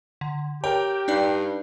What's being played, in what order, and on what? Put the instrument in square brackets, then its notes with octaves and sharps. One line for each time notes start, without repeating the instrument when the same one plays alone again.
[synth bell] D3
[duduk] G4 [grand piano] A#4 G5 [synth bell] C#5
[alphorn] G2 [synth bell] D4 D#4 D5